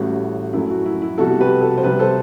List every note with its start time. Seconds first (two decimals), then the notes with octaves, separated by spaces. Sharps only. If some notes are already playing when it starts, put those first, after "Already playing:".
Already playing: A1 A2 G3 F#4
0.53 F#2 F#3 A3 E4
0.70 F#4
0.86 E4
1.02 E4
1.18 C2 B2 G3 F#4 A4
1.41 G4 B4
1.61 F#4 A4
1.78 C5
1.83 C2 C3 G3 G4 B4
1.99 A4 C5